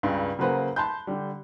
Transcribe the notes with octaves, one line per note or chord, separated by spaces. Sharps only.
C#2 G2 C#3
C#3 F#3 A#3 F#4 B4 C5
A5 B5 C6 F#6 G6
D3 G3